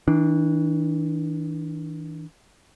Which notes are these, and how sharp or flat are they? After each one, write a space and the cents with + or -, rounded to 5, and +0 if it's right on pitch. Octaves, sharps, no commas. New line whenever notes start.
E3 -40 D4 +0